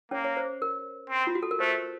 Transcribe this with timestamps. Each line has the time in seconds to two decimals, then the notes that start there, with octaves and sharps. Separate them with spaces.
0.11 A#3 C#4 C#5
0.24 C#5
0.37 C5
0.62 A#4
1.10 C4
1.27 F4
1.35 F#4
1.43 A4
1.51 A#4
1.59 A3 C5